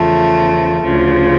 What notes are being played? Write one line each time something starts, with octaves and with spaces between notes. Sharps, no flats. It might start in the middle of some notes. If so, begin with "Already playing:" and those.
Already playing: E2 C#3 F3 A3
D2 C#3 F3